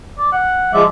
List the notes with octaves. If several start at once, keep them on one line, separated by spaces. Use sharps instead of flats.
D5
F#5
F3 G#3 D5 E5